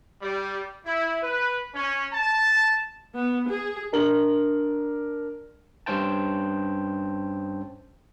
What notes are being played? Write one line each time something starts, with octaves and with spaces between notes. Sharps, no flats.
G3
E4
B4
C#4
A5
B3
G#4
D4 A#4 F#7
G2 C#4 C5 G5 A5